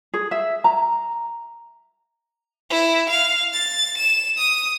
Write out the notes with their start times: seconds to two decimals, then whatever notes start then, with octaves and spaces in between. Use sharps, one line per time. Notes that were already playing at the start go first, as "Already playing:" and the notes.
0.14 G#4
0.31 E5
0.64 A#5
2.70 E4
3.10 F5
3.53 A6
3.97 E7
4.38 D#6